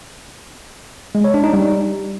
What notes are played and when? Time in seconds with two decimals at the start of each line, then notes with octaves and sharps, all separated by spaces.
1.15 G#3
1.24 C#5
1.34 D4
1.44 D#4
1.53 G3